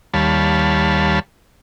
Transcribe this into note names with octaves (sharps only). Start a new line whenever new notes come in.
D#2 G3 C#5 F5 A5 B5